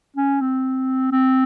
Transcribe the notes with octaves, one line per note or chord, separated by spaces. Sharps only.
C#4
C4
C4